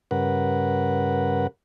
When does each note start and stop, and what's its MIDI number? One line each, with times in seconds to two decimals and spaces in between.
0.11 1.47 43
0.11 1.47 49
0.11 1.47 70
0.11 1.47 71
0.11 1.47 78